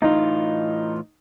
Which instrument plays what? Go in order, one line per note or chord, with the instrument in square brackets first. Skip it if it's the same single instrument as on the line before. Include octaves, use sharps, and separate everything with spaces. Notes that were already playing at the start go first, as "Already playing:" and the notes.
[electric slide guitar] A2 E3 F4 [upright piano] D#4